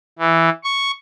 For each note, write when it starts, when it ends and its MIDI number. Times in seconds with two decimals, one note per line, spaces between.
0.19 0.50 52
0.64 0.91 85